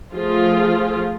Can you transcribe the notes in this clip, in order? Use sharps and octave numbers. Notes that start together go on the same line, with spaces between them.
F3 A3 F4 G#4